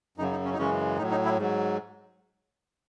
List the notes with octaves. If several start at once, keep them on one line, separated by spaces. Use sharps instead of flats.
F#2 C#3 F#3 D#4
D#4
C#4
D#4
F#2 C#3 E3 G#3 C#4
A2 F#3 D#4
D#4
E4
G#2 F#3